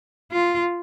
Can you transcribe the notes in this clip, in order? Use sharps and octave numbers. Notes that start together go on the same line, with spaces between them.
F4